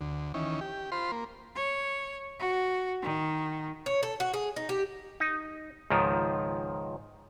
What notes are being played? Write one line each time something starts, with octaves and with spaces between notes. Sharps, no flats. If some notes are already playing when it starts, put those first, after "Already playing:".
D2
D#3 E3 C#4
G4
F4 C5 B5 C6
A#3
C#5
F#4
D#3
C#5
A4
F#4
G#4
D#4
G4
D#4
C#2 G#2 D#3 F3